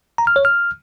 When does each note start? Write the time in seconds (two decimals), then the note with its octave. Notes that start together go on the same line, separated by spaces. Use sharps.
0.18 A#5
0.27 F6
0.36 C#5
0.45 F6